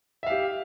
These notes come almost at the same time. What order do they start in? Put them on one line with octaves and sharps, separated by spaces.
E5 F5 G4